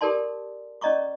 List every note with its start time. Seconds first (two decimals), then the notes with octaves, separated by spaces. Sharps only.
0.01 G4 A4 A#4 D5 A5 C6
0.81 C#4 D5 D#5 A#5 C#6 D6